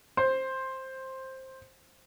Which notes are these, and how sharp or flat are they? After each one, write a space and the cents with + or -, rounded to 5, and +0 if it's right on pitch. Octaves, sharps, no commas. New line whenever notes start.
C5 +10